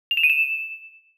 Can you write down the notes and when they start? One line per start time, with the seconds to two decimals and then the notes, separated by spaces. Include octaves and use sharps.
0.11 F7
0.17 E7
0.23 D#7
0.30 E7